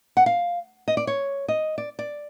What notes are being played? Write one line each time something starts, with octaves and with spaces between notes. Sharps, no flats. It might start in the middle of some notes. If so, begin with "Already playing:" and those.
F#5
F5
D#5
D5
C#5
D#5
D5
D5